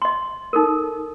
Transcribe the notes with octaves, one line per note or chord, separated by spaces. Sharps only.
D#5 C6
D#4 A4 A#4